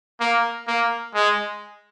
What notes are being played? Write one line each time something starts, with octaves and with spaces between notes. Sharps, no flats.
A#3
A#3
G#3